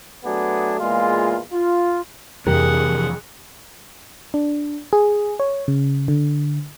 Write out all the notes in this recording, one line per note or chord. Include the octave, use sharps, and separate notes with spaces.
F#3 A3 B3 D4 G#4
E2 A#2 G#3 F4
F4
F2 C3 E3 G4 G#4 A#4 F#5
D4
G#4
C#5
C#3
D3